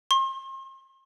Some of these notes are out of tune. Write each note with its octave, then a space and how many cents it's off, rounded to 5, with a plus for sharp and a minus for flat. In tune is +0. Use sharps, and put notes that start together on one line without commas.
C6 +40